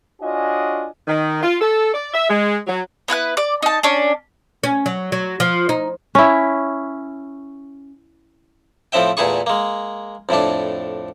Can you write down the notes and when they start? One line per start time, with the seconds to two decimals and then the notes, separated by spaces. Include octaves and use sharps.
0.21 D4 F4 F#4 C#5 D#5 G#5
1.07 D#3
1.43 F4
1.61 A4
1.93 D5
2.13 E5
2.29 G#3
2.67 F#3
3.08 B3 E4 B4 F#6
3.37 D5 D6
3.62 D#4 A5
3.83 C#4 D4 D5
4.63 C#4
4.86 F#3
5.12 F#3
5.40 F3
5.69 D#4
6.15 C#4 E4
8.92 A2 F3 C4 E5 G5
9.17 E2 A#2 A3 E4 G#4 C#6
9.46 G#3 A#3
10.29 F2 A2 A3 D4